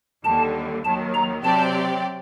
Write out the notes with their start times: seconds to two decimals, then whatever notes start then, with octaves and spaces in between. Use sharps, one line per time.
0.24 D#2 D3 G3 A5
0.84 D#2 D#3 F#3 A5
1.15 A#5
1.43 C3 F#3 C4 G4 D5 A5